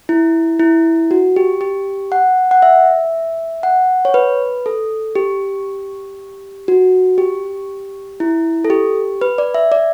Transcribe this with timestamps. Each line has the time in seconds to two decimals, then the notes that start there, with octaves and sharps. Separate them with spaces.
0.09 E4
0.60 E4
1.11 F#4
1.36 G4
1.61 G4
2.12 F#5
2.51 F#5
2.62 E5
3.63 F#5
4.05 C#5
4.14 B4
4.66 A4
5.15 G4
6.68 F#4
7.18 G4
8.20 E4
8.65 A4
8.70 G4
9.21 B4
9.38 D5
9.54 E5
9.72 D5